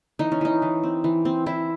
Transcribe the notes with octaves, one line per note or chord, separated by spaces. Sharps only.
E3 D#4
C#4
E3 D#4
E3
C4
E3
C4
C4 E4